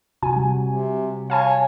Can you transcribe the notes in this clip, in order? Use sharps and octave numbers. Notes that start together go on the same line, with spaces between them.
C3 F#4 G#5
G3
C3
C#5 F5 G#5 A5